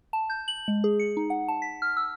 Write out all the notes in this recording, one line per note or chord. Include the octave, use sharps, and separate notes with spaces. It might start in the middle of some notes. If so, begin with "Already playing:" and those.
A5
G6
F#7
G#3
G#4
C#7
D#4
F#5
A5
B6
F6
E6